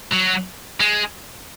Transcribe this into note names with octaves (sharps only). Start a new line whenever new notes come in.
F#3
G#3